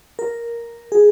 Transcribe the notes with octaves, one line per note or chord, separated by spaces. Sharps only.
A#4
G#4